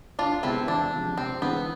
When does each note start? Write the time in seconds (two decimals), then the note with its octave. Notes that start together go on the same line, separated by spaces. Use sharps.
0.19 D2 D4 F4
0.43 C3 G#3 B3 C4 E4
0.68 E2 D4
0.93 C3 F3 G#3 C4
1.18 C3 C4
1.42 E3 G#3 B3 C4